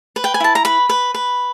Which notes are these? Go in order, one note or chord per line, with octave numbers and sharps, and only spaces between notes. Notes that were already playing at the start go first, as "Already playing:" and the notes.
B4
G5
G#5
E4 A5
A#5
B4 B5
B4
B4